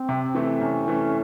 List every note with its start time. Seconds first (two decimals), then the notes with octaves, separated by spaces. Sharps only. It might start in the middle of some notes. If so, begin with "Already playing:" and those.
Already playing: C4
0.09 C3
0.35 E3 A3
0.50 C4
0.61 C3 C#4
0.88 E3 A3